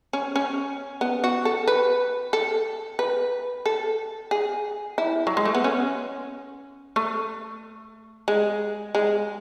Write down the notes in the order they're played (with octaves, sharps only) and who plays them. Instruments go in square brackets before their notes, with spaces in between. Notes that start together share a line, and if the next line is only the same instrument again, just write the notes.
[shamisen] C#4
C#4
B3
F#4
A4
B4
A4
B4
A4
G#4
E4
F#3
G#3
A3
B3
C#4
A3
G#3
G#3